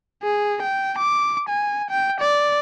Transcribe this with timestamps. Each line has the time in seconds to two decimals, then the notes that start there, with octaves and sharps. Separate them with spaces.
0.23 G#4
0.62 G5
0.99 D6
1.48 G#5
1.90 G5
2.20 D5